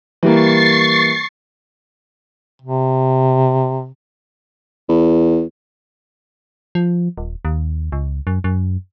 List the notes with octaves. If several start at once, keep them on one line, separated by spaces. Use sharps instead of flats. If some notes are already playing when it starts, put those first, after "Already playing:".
E3 G3 A#3 C#6 A6 C7
C3
E2
F3
D#1
D#2
C#2
F#2
F#2